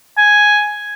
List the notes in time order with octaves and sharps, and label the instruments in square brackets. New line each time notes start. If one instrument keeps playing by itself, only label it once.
[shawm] G#5